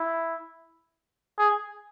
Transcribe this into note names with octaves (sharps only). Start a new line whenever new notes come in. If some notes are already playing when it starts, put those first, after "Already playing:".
Already playing: E4
G#4